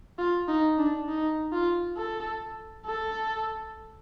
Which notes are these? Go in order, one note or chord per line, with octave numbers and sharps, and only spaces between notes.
F4
D#4
D4
D#4
F4
A4
A4